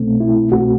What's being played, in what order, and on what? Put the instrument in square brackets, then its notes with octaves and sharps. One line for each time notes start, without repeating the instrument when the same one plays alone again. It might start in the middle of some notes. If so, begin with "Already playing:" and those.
Already playing: [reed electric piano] C2 B2 A3 C4
E4
C2 B2 A3 C4 F#4